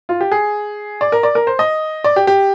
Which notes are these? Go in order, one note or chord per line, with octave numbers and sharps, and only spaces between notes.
F4
G4
G#4
D5
A#4
D5
A#4
C5
D#5
D5
G4
G4